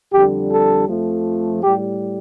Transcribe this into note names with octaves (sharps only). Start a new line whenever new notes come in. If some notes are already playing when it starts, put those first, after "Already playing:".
F2 D3 G3 G4
A4
F2 F3 A3
A2 G3 G4